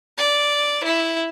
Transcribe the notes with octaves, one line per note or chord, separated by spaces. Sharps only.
D5
E4